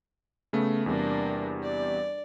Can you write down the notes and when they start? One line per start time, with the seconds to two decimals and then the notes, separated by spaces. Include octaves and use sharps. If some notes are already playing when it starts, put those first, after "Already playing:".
0.53 C#3 A3 B3
0.86 E2 C3 G3 A#3 D4
1.63 D5